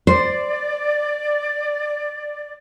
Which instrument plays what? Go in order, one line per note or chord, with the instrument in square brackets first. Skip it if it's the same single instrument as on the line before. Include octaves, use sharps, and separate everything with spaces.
[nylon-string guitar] C5 [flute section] D5